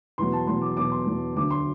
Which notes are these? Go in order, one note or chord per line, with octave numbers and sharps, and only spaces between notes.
E2 B2 F#3 C6
A5
E2 B2 F#3 C6
D6
E2 B2 F#3 D6
C6
E2 B2 F#3
D2 D3 F#3 D6
C6